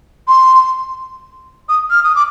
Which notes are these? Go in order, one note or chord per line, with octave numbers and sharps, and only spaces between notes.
C6
D#6
F6
D#6
D6